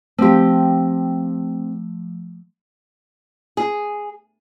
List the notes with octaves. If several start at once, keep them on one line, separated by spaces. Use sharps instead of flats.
F3 A3 C4 G4
G#4